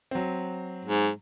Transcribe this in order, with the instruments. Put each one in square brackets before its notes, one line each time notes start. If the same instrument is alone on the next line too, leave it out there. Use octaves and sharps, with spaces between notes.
[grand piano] F#3 C4
[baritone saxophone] G#2